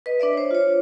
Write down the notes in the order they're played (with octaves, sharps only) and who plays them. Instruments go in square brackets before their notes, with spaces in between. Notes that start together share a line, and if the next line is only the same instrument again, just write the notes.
[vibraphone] B4 D#5
D4 B4 D5 E5
C5 C#5
F4 C#5